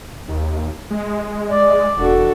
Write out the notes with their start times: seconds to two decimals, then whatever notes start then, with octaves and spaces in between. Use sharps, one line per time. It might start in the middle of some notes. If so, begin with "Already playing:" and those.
0.28 D#2
0.90 G#3
1.50 D5
1.97 E1 D4 F#4 A4